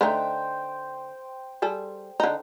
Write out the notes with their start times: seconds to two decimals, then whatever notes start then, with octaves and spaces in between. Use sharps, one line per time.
0.01 D3 A3 D#4 C5 G5
1.62 G3 G#4 A4
2.20 D3 D#4